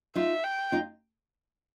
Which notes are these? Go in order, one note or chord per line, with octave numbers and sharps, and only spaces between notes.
D#4 F4 E5
G5
D#4 F4